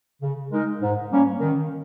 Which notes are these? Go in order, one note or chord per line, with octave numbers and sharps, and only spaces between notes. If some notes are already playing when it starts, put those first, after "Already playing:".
C#3
G#3 D#4 A#4
G#2
G3 A#3 C#4
D#3